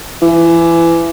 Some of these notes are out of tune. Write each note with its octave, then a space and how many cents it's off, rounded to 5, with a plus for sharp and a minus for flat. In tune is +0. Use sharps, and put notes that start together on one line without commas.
E3 +25